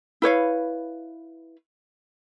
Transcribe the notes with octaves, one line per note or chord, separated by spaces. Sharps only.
E4 B4 C#5 F5